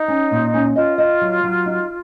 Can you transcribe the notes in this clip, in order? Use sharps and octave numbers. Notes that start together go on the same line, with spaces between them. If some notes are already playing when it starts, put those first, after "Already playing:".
Already playing: D#4
C#4
A#2
C#4
F4 D#5
D#5
F#3
F#3
D#4